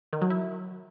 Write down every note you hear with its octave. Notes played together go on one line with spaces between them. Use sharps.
D#3
F#3
E4